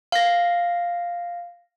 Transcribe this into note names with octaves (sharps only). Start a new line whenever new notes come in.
F5 A#6